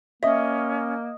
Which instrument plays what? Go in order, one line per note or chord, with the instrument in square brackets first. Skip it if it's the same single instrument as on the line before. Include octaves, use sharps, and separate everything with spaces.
[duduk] A#3 [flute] C#4 [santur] D#5 [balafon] E5